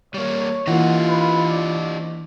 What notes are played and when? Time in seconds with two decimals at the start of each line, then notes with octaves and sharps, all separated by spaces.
0.14 G3 A#3 C#5
0.67 E3 A#3 D4 F4 G4 D#5 F#5
1.09 B4
1.50 D5